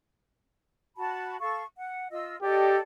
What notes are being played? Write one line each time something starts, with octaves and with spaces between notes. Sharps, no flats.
F#4 A5 B5
A4 F5 C#6
F#5
F4 D#5 E6
G4 A4 D5 D#5